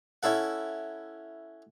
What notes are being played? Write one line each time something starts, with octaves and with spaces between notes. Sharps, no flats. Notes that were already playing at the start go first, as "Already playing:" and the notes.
C#4 E4 A4 F#5